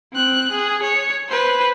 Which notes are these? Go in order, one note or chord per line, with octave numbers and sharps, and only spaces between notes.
C4 F#6
G#4
C#5
B4 C5